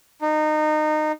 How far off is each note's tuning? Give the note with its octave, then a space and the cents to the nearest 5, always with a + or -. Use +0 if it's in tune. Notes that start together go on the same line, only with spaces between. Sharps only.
D#4 -25